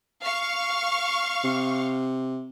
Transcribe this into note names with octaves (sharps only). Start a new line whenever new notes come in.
F5 C#6
C3